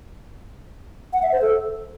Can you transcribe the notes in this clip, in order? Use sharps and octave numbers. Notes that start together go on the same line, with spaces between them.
F#5
E5
C5
A4